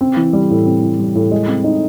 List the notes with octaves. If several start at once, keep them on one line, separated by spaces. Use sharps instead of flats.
C4
E3
G3
A2
C4
E3
G3
A2
G#3
C4
D#4